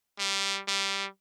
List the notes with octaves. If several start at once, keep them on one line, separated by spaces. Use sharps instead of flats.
G3
G3